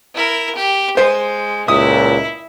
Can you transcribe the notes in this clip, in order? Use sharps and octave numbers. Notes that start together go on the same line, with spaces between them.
E4 A#4
G4
G#3 C5
C#2 A#2 E4 E5 D#6